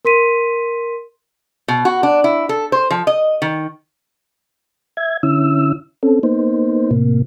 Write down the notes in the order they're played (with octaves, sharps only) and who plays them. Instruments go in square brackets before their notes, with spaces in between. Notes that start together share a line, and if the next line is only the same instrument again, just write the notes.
[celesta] A#4 C6 B6 D#7
[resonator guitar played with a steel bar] B2
F#4
D4
E4
A4
C5
F3
D#5
D#3
[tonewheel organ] E5 G#6
D3 C#4 E4 E6
C4 C#4 A4
A#3 B3 D#4 C5
A2 C3 A#3